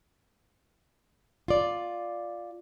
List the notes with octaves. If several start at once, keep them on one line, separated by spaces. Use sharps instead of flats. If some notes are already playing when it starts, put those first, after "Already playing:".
F4 D5